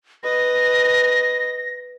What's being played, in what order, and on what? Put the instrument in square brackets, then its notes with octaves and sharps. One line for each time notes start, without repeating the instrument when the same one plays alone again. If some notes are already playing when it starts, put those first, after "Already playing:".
[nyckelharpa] B4 D#5 [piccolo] A#6